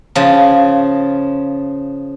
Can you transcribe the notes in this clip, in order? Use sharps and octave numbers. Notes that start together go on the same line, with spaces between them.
C#3 F3